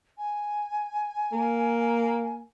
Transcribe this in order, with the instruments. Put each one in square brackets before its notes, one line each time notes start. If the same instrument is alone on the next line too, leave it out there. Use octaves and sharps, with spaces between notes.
[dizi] G#5
[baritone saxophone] A#3